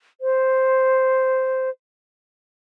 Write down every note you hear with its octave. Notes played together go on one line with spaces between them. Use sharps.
C5